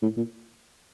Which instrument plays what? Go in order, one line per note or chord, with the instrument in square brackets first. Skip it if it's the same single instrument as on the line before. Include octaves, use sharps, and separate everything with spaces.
[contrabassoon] A2
A#2